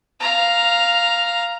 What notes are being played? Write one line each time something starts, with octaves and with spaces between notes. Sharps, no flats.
F5 A#5